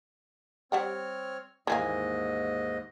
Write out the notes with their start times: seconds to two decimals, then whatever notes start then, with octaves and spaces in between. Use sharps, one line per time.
0.72 G3 C4 C#5 F#5 G5 F6
1.67 D#2 G#2 E3 A#3 D#5 G#5